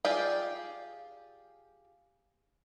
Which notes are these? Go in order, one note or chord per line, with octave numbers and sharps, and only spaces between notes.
F4 G4 G#4 D5 G5